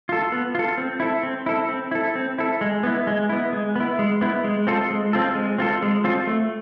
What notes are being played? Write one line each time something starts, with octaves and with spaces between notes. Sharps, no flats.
F4 A4
B3
F4 A4
C4
E4 A4
C4
E4 A4
C4
E4 A4
C4
E4 A4
G#3
B3 E4
G#3
B3 E4
G#3
B3 E4
G#3
B3 E4
G#3
C4 F4 A4
G#3
C4 F4 A4
G#3
C4 F4 A4
G#3
C4 F4 A4
A3